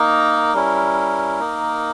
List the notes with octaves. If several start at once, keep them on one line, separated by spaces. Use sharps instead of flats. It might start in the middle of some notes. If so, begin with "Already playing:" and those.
Already playing: A#3 D#4 A#4
G3 C#4 E4
A#3 D#4